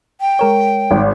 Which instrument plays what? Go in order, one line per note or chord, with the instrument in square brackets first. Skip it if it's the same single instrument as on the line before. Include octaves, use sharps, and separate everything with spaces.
[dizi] G5
[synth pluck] G#3 A#4 C#5
[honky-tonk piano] G#1